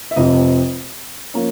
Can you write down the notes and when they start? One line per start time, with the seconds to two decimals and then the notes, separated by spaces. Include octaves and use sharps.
0.11 E5
0.16 F1 F2 C3 F3 D#5
1.34 F3 A#3 C#4